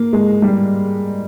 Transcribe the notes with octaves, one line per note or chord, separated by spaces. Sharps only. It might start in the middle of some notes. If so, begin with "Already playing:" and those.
Already playing: A#3
G#3
G3